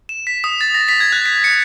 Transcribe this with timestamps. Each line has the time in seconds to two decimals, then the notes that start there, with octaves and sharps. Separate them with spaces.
0.09 E7
0.27 B6
0.44 D#6
0.61 A6
0.74 A#6
0.88 B6
1.00 G#6
1.12 F#6
1.26 B6
1.44 C#7